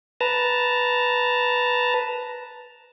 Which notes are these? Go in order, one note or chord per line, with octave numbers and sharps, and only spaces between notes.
B4 A5 A#5